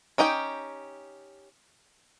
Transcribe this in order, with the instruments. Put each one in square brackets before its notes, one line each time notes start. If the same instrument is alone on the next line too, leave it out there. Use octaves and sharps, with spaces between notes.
[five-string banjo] C#4 D#4 G4 G5